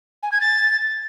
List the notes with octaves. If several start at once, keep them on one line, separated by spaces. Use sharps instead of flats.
G#5
G#6
A6